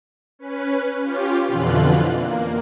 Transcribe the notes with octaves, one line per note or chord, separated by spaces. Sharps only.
C#4 B4
C#4 F4 G4
F2 B2 D3 E3 F4 F#6
A#3